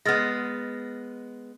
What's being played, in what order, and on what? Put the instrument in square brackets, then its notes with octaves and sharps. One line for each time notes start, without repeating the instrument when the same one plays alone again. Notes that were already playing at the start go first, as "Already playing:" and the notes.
[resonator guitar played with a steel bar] G#3 B3 [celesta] F6 A6 A#6